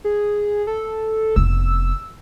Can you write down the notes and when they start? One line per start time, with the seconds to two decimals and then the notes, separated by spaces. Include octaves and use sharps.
0.04 G#4
0.67 A4
1.36 F1 B3 E6